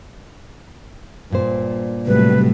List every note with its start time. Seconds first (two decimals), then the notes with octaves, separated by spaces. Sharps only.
1.30 G2 A#2 C5
2.07 A2 C3 F#3 G3 B4